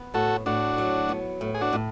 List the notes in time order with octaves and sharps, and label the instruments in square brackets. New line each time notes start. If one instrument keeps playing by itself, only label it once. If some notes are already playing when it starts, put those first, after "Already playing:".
Already playing: [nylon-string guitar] B3
[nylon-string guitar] A2 [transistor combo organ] F#4 A4
[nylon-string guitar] A2 [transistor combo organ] D4 F#4
[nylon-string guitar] F#3
B3
A2
[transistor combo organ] G#4
D4 F#4
[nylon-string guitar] A2